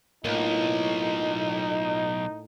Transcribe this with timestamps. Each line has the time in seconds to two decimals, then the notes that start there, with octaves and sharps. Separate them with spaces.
0.25 B1 A2 A#3 D#4 F4 D#5